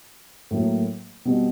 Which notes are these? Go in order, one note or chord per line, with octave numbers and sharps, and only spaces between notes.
A2 F#3 A#3
B2 G3 C4